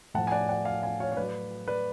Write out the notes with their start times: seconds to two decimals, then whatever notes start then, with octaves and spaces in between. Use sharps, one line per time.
0.14 A2 F3 F#5 A5
0.27 G#5
0.32 D5 F#5
0.48 D5 F#5
0.65 F5 G#5
0.82 F5 G#5
1.00 C#5 F5
1.12 C#5
1.17 A2 F#3 B4 D5
1.68 B4 D5